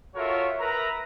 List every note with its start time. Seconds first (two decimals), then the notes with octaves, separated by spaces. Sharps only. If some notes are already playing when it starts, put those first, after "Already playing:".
0.15 F4 F#4 A4 A#4 C#5 E5
0.60 A#4 B4 E5 A#5